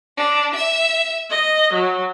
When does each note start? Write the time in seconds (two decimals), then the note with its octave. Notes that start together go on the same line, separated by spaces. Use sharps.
0.17 D4
0.55 E5
1.29 D#5
1.73 F#3